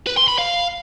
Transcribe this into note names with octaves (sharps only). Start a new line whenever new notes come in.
B4
C6
B5
F5